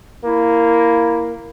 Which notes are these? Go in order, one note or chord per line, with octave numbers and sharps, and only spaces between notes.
A#3 E4